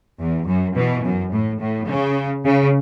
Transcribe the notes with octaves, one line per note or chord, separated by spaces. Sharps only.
E2
F#2
B2 E3
F#2
A2
A2
C#3
C#3